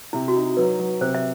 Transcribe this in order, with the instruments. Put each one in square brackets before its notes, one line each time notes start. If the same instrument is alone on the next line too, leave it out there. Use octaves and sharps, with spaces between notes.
[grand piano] C3 [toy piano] E4
[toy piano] F#4
[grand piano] D#4
[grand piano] F#3 [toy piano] B4
[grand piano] F#3
[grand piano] C3 [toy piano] C5
[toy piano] E5